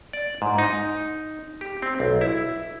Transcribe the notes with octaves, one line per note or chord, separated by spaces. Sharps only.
D5
G#2
D#4
G4
C4
B1
E4